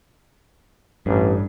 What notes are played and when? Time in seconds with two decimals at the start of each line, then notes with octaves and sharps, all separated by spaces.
1.06 A1 G2